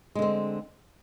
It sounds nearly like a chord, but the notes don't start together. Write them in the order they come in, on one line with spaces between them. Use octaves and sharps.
G#3 D3 C4